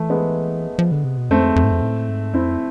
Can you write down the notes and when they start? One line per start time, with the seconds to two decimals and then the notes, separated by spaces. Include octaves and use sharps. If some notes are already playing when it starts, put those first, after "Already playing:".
Already playing: E3 A3
0.10 G#3 B3
0.79 F3
0.92 D3
1.04 C3
1.17 B2
1.30 F2 A3 C4
1.56 F2
1.64 G#2
1.71 F2
1.82 A2
2.08 G#2
2.34 F2 C4 E4